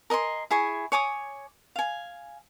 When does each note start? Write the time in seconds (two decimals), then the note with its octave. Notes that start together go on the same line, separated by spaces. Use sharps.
0.10 A#4 D#5 G#5 C6
0.51 E4 G#4 G#5 C#6
0.92 C#5 G#5 D6 D#6
1.76 F5 G#5